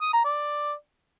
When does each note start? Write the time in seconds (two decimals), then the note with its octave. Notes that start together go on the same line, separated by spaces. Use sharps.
0.01 D#6
0.13 A#5
0.25 D5